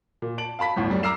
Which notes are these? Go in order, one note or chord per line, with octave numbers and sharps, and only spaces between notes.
A#2
A5 D7 F#7
F5 A5 B5 B6
G1 D2 A2
F#2 G3
A#5 D6 E6 F6 C7 E7